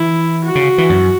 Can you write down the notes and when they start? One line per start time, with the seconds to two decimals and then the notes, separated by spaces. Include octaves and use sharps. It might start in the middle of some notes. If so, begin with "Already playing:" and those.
Already playing: E3 E4
0.44 F#4
0.55 C#3
0.78 E3
0.90 F#2